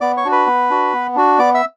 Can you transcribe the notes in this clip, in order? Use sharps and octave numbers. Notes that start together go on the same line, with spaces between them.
B3 D5 D6
C#5 C#6
D4 F#4
B4 B5
B3
D4 F#4
B3
D4 F#4
B3 D5 D6
E5 E6